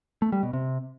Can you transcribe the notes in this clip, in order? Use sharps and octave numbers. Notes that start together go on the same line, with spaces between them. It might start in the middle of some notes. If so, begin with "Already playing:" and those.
A3
G3
B2
C3